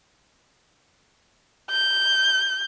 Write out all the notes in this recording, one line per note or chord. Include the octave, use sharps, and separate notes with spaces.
G6